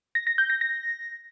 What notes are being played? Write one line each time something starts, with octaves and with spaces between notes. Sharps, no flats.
A#6
A#6
G6
A#6
A#6